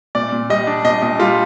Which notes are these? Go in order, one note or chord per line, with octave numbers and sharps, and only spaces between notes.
A#2 D5
A#2
G3 D#5
D4
A#2 D#5
A#2 D#5
G3 F4